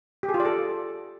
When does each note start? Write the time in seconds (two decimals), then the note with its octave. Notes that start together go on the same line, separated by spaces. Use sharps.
0.23 G4
0.29 G#4
0.34 F4
0.40 D5
0.45 A4